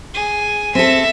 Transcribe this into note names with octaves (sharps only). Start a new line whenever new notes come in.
G#4
C4 A4 E5